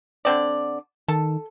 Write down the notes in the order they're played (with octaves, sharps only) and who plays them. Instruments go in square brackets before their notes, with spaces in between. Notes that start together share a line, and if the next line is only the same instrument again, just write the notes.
[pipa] D3 C4 D5
[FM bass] D#3 [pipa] A4